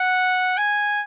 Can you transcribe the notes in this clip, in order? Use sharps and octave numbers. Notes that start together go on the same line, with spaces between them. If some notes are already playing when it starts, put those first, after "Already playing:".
Already playing: F#5
G#5